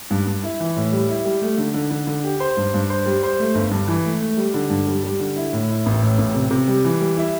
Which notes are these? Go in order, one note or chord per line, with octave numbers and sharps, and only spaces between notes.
G2
G2
E4
E3
A2
G3
E4
G3
A3
D3
D3
D3
D3
G4
C5
G2
G2
C5
G3
C5
A3
G1
G2
E3
A3
A3
G3
D3
G2
G3
G3
D3
E4
A2
E4
A1
A2
A1
C3
C3
G3
E3
G3
E4